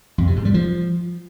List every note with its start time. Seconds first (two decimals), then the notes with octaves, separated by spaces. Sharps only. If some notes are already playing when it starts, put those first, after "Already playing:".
0.18 F2
0.27 C3
0.36 G#2
0.45 G3
0.54 F3